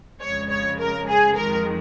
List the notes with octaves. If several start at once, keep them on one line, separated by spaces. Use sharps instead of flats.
F2 C#3 G#3 C#5
C#5
A#4
G#4
F2 D#3 G#3 A#4